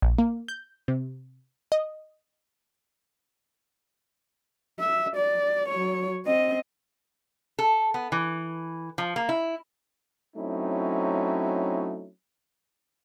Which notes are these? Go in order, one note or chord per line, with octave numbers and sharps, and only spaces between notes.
A#1
A#3
G6
C3
D#5
E5
D5
F#3 C#5
C4 D#5
A4
B3
E3
F3
A#3
E4
F#3 A3 C4 C#4 D#4 E4